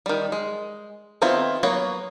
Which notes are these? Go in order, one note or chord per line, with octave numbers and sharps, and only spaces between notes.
D#3 G3
G#3
D#3 B3 C4 E4 F4
F#3 A#3 B3 C#5